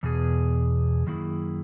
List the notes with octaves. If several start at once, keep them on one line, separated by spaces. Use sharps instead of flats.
E2 B2 G#4
F#2 D#3 A#3 E4 G#4